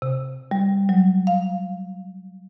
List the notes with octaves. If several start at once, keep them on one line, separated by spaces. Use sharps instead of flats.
C3
G3
F#3
F5